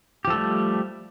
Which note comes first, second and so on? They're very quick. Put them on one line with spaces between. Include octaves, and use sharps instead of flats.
G4 F3 A4 A3 G3